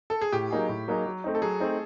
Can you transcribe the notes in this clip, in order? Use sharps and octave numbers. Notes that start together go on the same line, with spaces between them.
A4
G#4
A2 G4
F#3 A#3 D#4 G#4
A2
F#3 A#3 D#4 G#4
F#3
A3 C4 D#4
A4
F#3 G#4
A3 C4 D#4